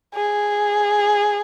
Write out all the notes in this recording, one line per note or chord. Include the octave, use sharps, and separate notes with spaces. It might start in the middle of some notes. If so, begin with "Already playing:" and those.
G#4